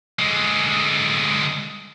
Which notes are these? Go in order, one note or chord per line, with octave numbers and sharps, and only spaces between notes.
D3 G#3